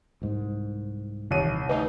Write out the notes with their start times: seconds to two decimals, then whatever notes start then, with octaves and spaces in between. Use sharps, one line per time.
0.22 C2 G#2
1.31 D#1 C2 D#3 E3 C#5 D#7
1.69 D2 E3 D#4